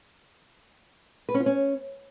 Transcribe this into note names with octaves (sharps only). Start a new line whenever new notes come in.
B4
C#4
F4
C#4